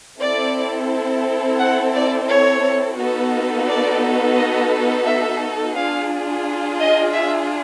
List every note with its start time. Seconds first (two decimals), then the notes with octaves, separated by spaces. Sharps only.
0.19 C4 E4 A4 D5
1.58 F#5
1.93 D5
2.28 C#5
2.97 B3 D#4 F#4 A4
3.66 D5
4.36 D#5
5.05 E5
5.75 D4 F4 G#4 F5
6.79 D#5
7.13 E5